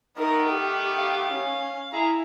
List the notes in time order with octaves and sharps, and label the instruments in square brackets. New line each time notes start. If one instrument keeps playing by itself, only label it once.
[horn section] D#3 A3 B3 [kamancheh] D#4 A#4
[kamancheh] G4
[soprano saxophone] F5
[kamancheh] C#4
[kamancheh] E4 [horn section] G#4 E5 A#5